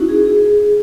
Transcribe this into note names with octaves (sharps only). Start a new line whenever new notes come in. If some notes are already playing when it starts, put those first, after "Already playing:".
Already playing: C#4 D#4 E4 F#4
G#4
G#4